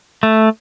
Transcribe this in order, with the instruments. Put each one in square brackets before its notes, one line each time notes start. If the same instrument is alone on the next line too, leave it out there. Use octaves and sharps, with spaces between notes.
[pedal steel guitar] A3